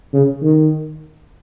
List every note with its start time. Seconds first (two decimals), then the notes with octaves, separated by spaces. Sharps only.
0.13 C#3
0.42 D#3